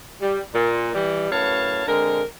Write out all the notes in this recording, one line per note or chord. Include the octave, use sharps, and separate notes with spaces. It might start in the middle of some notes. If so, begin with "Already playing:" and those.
G3
A#2
E3 G3
F#2 A2 B4 C#5 F5 A5
D3 G#3 C4 A#4